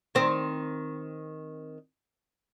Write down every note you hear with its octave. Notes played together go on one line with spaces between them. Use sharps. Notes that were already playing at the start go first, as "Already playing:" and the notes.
D#3 C4